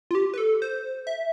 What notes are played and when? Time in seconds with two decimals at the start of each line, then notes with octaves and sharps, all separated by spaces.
0.11 F4
0.15 G4
0.34 B4
0.38 A4
0.62 C5
1.07 E5